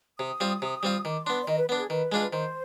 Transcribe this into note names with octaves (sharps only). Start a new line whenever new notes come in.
C3 D#6
G3 C4 F4
C3
G3 C4 F4
D#3 D6
B3 D4 C6
D5
D#3 D#5
B4
B3 D4 B4
G#4
D#3 B4
G#3 D4 F4
D#3 C5